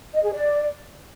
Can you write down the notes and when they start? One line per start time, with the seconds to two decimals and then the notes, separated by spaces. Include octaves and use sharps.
0.13 D#5
0.23 G#4
0.33 D5